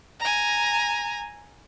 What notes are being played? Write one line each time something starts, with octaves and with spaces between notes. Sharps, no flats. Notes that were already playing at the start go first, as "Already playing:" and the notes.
G#5 A#5